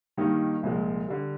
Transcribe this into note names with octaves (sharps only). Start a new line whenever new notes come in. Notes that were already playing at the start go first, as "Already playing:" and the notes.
G2 D#3 G3 A#3 D#4
C2 A#2 F3 G#3
D3 G3